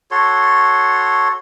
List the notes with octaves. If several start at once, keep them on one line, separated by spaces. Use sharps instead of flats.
F#4 A4 C#5 C6